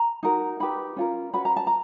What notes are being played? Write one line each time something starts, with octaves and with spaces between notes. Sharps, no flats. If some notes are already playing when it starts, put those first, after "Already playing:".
Already playing: A#5
D#4 F#4 A#4
D#4 G4 B4 B5
C#4 F4 A#4
C#4 F#4 B4 B5
A#5
A5
A#5